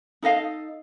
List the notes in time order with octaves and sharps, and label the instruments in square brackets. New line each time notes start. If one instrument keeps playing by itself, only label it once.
[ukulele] D#4 A4 D#5 F5